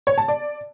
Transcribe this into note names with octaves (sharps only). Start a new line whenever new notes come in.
C#5
A5
D5